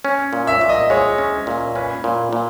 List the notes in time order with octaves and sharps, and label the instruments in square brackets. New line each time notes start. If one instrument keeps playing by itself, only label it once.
[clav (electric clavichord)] C#4
A#2
[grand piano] E5
[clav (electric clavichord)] A#2
[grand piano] D#5
[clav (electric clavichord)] G#3 [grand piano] C#5
[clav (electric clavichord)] C#4
A#2
[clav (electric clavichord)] C#4 [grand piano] B4
[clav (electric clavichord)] A#2
A#2